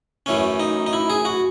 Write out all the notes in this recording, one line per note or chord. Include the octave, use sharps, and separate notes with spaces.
F#2 E3 A3 C#4
D#4
D#4
E4
G#4
F#4